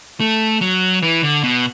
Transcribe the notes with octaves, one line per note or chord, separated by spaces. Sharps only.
A3
F#3
E3
D3
B2